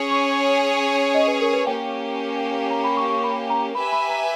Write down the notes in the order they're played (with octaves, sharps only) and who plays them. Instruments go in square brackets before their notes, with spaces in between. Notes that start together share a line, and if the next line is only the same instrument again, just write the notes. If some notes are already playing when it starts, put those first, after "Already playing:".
Already playing: [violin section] C#4 G#4 C#5
[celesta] C#6
D#5
B4
A#4
B4
[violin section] A#3 C#4 G4 [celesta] G5
[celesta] A#5
B5
C#6
C#6
B5
A#5
[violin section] G4 B4 E5 G#5 [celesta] B5
[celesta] B5
A#5